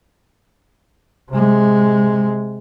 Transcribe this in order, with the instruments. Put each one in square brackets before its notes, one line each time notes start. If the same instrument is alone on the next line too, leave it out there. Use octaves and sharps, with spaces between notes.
[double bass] C3 G#3